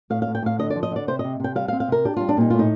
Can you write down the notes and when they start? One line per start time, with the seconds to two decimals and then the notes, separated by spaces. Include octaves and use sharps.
0.10 A2 F5
0.22 F5
0.27 A2
0.35 G5
0.42 A2 F5
0.59 D3 D#5
0.70 D5
0.76 F3
0.83 D#5
0.91 D3 D5
1.08 C3 C5
1.19 D#5
1.24 C3
1.40 C3 G5
1.55 G3 F5
1.68 F5
1.73 C4
1.80 F5
1.88 C3 A#4
2.05 D4 G4
2.17 G3 F4
2.29 D4
2.37 A#2 D#4
2.50 A2 F4
2.59 D#4